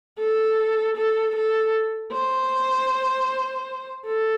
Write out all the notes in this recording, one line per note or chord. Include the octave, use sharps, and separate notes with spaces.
A4
A4
A4
C5
A4